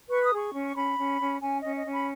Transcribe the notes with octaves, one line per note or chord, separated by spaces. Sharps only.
B4 C#6
D#6
G#4 C#6
C#4
C#6
C#4 B5
C#4
C#4
C#4 G#5
C#4 D#5
D#5
C#4
B5